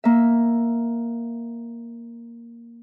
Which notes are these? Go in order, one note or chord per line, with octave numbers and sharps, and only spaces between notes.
A#3 E5